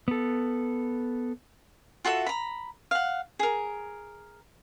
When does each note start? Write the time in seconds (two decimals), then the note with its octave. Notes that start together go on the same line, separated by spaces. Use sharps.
0.08 B3 A4
2.05 F4 F#4 A4 E5
2.26 A#5 B5
2.91 F5 F#5
3.39 G#4 A#4